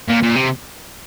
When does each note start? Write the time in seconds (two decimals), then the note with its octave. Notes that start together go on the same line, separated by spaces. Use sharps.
0.08 A#2
0.23 A#2
0.36 C3